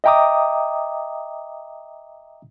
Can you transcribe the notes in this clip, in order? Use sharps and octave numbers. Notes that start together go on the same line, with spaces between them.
D#5 E5 G5 A#5 D6 D#6